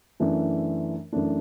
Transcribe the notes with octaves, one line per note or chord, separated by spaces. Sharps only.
F#2 E3 A3 D4
F#2 E3 A3 D4